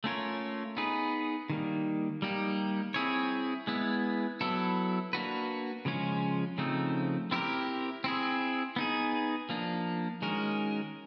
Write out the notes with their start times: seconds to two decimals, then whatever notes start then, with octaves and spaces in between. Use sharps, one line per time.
0.04 A3 C#4 F4 A#4 C#5
0.77 B3 D#4 G#4 B4
1.50 D#3 G3 A#3
2.22 G3 A#3 D#4 G4
2.94 C4 E4 G#4 C#5
3.67 G#3 B3 E4
4.41 F#3 B3 E4 A4
5.13 A#3 D4 F#4 B4
5.85 C#3 F3 G#3 C#4 F4
6.58 C#3 F3 A3 C4 D#4
7.31 C4 E4 G4 A#4
8.04 C4 E4 G#4
8.76 B3 D#4 G#4
9.49 F3 A#3 D4
10.22 D#3 G#3 C#4 F#4 A#4